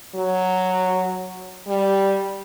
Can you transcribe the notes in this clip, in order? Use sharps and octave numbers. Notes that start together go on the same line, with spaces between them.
F#3
G3